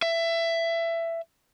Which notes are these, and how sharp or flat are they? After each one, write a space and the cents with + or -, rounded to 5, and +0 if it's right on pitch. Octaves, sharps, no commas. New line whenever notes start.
E5 +20